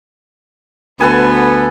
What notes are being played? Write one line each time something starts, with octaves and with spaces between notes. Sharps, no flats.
D2 B3 A4 B4 G#5